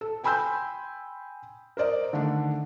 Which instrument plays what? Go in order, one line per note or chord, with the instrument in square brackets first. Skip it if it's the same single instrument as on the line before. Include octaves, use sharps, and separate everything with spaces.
[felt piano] A4
G5 G#5 B5 C6 E6 G6
A#4 C5 D5 D#5
D3 D#3 A3 D4